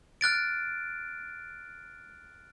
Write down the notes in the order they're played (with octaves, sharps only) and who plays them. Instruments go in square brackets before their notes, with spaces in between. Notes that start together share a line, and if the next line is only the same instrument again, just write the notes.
[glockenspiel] F6 F#6 A6 D7